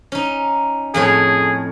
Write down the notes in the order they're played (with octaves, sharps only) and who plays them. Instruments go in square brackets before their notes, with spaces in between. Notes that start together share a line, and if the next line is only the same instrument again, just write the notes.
[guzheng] C#4 D#4
[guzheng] F2 A2 C#5 [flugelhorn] G#4